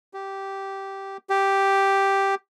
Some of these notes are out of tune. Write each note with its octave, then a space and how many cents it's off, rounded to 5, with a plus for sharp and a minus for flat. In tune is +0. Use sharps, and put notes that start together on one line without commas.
G4 -10
G4 +0